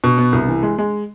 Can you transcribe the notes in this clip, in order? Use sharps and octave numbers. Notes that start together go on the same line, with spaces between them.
B2
B3
C2
E3
G#3
G#3